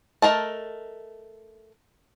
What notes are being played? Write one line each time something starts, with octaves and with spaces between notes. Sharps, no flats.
A3 A#4 D#5 A5